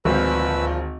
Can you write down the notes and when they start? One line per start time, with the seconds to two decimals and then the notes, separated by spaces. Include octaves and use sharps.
0.05 G#1 D2 A#2 F3 B4 E6